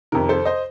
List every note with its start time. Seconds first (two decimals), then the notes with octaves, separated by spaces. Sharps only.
0.12 F2 C3 D#3 A#4
0.29 A4 C5
0.45 C5 D#5